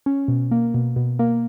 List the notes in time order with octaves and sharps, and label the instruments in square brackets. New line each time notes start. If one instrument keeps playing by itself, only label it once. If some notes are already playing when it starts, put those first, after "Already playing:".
[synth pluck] C#4
B2
A#3
B2
B2
A#3